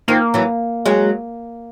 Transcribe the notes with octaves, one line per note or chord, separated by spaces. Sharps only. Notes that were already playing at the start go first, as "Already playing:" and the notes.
D#3 F3 A#3
E3 F#3
F#3 G#3